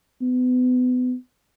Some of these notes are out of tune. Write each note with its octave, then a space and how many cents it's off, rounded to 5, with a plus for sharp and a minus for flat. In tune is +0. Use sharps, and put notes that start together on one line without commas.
B3 +30